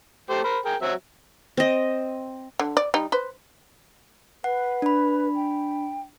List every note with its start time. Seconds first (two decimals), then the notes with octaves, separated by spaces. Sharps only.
0.30 A3 G4 C5
0.44 A#4 C5 B5
0.65 G#4 A#4 G5
0.82 F#3 C4 E5
1.57 C4 D#5
2.59 D3
2.77 D5
2.94 G3 D#4
3.12 B4 C5
4.44 B4 F#5
4.82 D4 B5
5.35 G5